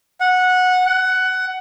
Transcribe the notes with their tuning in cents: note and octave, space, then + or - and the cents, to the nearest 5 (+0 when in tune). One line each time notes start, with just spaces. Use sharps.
F#5 -15
F#5 +15